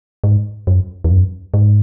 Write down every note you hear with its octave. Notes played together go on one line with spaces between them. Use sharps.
G#2
F#2
E2
F#2
G#2